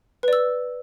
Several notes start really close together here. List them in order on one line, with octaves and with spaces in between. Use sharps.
B4 D5 E6